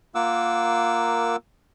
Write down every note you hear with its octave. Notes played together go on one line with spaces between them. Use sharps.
A#3 F4 A#4 F#5 D6 E6